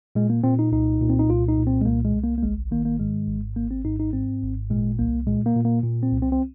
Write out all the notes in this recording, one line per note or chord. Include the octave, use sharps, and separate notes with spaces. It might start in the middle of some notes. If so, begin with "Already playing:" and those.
A#2 G#3
A#3
A#2 C4
D#4
C2 D#4
A#2
C4
D#4
C2 F4
D#4
A#2
C4
G#3
C2 A#3
G#3
C2
A#3
A#3
G#1 G#3
D#3 A#3
A#3
G#2 G#3
G#1
G#1 A#3
C4
G#2 D#4
D#4
G#2 C4
G#1
A#2 G#3
C2 A#3
A#2 G#3
A#3
A#2
A#3
A#2
C4
C2
C4
C4